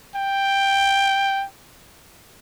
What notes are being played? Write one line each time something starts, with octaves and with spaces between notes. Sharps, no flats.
G5